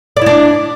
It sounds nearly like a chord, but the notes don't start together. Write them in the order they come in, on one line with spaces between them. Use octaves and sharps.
D5 E4 D4